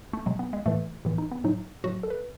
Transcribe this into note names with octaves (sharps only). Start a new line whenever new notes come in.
A3
B2 F#3 G#3
B3
G#3
A2 E3 A3
A2 E3 B3
D#4
B3
A2 F#3 D#4
A2 F#3 F#4
A4
B4